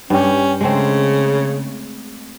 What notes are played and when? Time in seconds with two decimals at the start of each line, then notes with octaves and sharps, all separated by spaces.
0.10 G2 C#4 G4
0.61 C#3 G#3 A3 C4